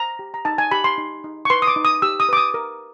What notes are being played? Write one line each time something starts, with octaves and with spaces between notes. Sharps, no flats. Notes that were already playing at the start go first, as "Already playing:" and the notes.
Already playing: C5 A#5
G4
A#5
D#4 A5
G#5
G4 B5
C6
D#4
D#4
C#6
B4 C6
D#6
D6
D#4
D#6
G4 E6
D#6
B4 D6
D#6
A#4